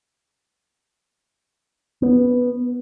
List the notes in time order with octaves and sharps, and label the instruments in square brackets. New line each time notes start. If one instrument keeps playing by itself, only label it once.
[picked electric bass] B3